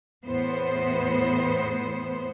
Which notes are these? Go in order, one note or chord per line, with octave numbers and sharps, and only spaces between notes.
E2 A2 B3 C5